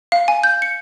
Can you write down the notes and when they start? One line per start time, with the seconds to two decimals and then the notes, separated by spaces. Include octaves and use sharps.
0.12 F5
0.28 G#5
0.44 G6
0.62 C#7